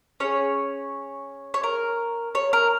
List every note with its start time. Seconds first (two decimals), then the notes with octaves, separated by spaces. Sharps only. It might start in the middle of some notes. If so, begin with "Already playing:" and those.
0.20 C#4 G#4 C#5
1.54 C#5
1.63 A#4
2.35 C#5
2.53 A#4